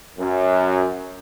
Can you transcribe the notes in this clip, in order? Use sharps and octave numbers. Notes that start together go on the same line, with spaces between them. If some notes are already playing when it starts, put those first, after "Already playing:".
F#2